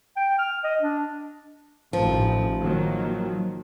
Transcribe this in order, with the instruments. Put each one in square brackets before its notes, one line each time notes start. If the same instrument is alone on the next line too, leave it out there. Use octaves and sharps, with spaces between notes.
[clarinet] G5
F6
D#5
D4
[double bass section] A1 D#3 [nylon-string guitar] F3
[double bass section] D#3 F#3 A#3